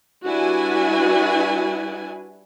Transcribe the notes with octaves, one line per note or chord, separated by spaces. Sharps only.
G3 D4 E4 F#4 B4 G#5